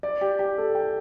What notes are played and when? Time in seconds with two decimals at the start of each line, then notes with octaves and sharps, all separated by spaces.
0.03 D5
0.21 G4
0.39 G4
0.58 A4
0.75 G5